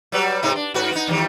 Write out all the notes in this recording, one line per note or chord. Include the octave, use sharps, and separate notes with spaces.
F#3 G3 B4
G#2 C3 D#4
D4
G#2 F#4 B4
B3 D#4
E2 D#3 G3